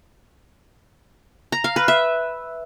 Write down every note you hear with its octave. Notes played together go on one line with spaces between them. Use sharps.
A#5
F5
B4
E5